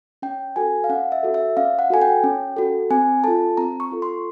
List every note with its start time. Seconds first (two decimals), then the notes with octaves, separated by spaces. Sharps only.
0.22 C#4 G5
0.56 F#4 A4 G#5
0.84 F5
0.90 C#4 F#5
1.12 E5
1.23 F#4 A4
1.34 E5
1.57 C#4 F5
1.79 F#5
1.90 F#4 A4 G#5
2.02 G5
2.24 C#4
2.57 F#4 A4
2.90 C4 G#5
3.24 F4 A4 A5
3.57 C4 A#5
3.80 C#6
3.91 F4 A4
4.02 C6